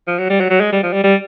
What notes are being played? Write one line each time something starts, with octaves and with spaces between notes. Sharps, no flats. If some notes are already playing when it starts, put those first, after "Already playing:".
F3
F#3
G3
F#3
F#3
G#3
G3
F3
G3
G3